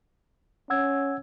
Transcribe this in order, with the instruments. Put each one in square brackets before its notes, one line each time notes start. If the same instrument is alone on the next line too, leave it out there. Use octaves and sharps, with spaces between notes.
[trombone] C#4 [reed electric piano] F#5 E6 G#6